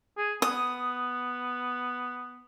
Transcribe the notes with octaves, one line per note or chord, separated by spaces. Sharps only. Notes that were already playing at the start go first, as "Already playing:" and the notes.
G#4
B3 D#6